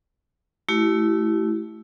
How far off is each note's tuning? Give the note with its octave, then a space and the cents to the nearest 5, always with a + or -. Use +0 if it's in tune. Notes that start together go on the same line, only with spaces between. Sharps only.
A3 -20 E4 +0 G4 -40